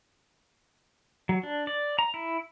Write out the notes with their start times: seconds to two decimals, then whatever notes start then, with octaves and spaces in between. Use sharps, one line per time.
1.29 F#3
1.43 D4
1.67 D5
1.99 A#5
2.14 E4